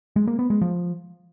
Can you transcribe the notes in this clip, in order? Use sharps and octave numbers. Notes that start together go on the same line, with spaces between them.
G#3
A#3
B3
G#3
F3